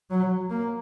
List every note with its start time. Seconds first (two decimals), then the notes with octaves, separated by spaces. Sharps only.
0.10 F#3
0.50 A#3